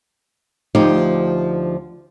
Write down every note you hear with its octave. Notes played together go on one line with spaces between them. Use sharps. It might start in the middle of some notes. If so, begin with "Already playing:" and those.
D2 F3 D#4 G4